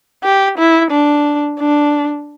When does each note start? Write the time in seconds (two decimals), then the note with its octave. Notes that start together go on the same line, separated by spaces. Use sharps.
0.24 G4
0.59 E4
0.91 D4
1.60 D4